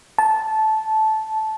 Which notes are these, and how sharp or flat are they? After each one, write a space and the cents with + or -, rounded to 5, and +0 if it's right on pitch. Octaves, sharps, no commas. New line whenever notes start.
A5 -15